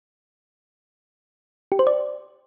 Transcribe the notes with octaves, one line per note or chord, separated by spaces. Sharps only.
G4
C5
D5